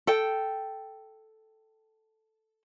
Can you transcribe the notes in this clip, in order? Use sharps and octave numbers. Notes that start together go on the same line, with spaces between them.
A4 G5